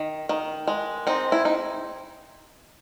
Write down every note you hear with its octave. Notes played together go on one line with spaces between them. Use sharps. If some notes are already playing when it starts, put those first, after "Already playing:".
Already playing: D#3
D#3
G#3
C4 D#4
E4
D#4